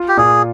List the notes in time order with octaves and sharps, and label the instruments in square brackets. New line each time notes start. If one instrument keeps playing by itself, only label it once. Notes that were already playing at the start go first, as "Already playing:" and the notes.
Already playing: [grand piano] F4
[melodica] G4
[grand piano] A#2 [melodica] G#4